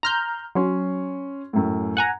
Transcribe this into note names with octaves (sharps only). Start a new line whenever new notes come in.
A#5 C6 F6 G6
F#3 C#4 C6
F#2 A2
F#5 G#5 A#5